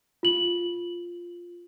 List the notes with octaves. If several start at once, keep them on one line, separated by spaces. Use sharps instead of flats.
F4 F#7